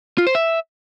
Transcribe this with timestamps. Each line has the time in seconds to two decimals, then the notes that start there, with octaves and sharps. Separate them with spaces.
0.18 F4
0.27 C5
0.35 E5